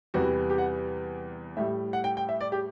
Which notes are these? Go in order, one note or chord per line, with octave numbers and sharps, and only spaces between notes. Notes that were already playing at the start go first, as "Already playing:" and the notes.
E2 C3 E3 G3 F#4
G4
F#5
A2 G3 E5
F#5
G5
G5
E5
D5
G4